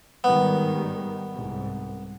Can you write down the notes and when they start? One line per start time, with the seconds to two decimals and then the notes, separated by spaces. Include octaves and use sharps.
0.24 G#2 D#3 G3 B3
1.34 C2 G#2